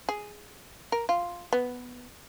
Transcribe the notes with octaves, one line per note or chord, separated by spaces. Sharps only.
G#4
A#4
F4
B3